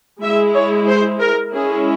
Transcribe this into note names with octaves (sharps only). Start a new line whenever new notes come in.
G#3 E4 E5
C#5
C5
A#4
G#3 C#4 E4 G#4